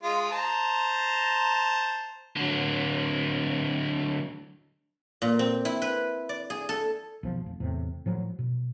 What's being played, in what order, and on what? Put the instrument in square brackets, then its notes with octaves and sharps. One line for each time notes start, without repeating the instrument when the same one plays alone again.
[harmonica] G#3 F4
C5 A5 A#5
[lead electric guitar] D3 F#3
[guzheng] A#2
C4
E4
B4
D5
G#4
A4
[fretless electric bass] B1 F3
F1
E2 A2 C3
A2 F3 F#3
B2